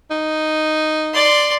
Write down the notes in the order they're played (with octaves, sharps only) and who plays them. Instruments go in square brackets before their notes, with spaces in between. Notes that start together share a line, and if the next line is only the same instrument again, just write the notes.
[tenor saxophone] D#4
[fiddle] D5 C6